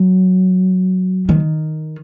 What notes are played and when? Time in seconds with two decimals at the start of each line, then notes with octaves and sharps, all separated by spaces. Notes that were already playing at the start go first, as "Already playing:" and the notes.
Already playing: F#3
1.29 D#3